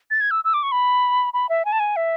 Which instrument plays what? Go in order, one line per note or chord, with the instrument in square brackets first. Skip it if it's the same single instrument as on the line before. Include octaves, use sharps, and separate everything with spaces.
[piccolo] A6
G#6
E6
E6
D6
C#6
B5
B5
E5
G#5
A5
G#5
E5